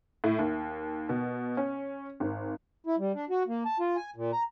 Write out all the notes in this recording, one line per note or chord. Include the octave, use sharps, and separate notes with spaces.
A2
D#2
B2
C#4
G#1
E4
G3
D4
F#4
A#3
A5
F4
G#5
A#2
A#5